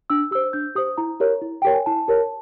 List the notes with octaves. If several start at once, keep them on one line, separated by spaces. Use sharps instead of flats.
D4 E6
G4 C5 E6
D4 G6
G4 C5 D#6
E4 A#5
G4 A#4 C#5
E4
G4 A#4 C#5 G5
G#5
E4 A5
G4 A#4 C#5